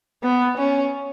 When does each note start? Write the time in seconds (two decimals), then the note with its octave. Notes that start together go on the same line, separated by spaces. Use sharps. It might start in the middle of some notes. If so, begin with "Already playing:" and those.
0.23 B3
0.58 C#4